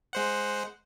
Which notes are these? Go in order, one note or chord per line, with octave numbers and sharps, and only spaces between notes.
G#3 C5 F#5